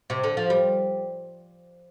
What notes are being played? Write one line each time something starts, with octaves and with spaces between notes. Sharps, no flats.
C3
D3
F3
G3